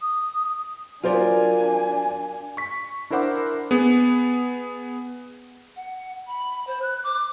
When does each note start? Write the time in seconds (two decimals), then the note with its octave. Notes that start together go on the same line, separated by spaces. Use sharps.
0.01 D#6
1.04 F#3 D4 F4 A#4 C5 D5 G#5
2.57 C#6 B6
3.10 D4 E4 A#4 C5 F#5 D6
3.71 B3 G#4
5.76 F#5
6.27 B5
6.67 C5
6.82 F#6
7.04 D6